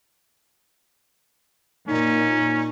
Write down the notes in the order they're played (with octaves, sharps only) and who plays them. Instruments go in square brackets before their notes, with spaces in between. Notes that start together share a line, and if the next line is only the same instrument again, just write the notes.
[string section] A#2 [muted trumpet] C#4 [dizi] D#4